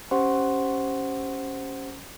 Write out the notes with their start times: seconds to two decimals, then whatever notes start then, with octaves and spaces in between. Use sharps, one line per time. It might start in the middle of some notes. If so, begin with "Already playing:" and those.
0.11 C#4 G4 C5 F#5 C6 C#6